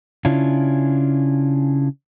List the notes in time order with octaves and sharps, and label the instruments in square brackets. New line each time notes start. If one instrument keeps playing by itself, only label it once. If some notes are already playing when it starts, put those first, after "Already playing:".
[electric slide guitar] C#3 C#4 D4 E4 F4